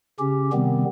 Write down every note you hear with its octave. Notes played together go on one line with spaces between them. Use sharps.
C#3 C#4 G4
C3 D#3 G3 B3 C4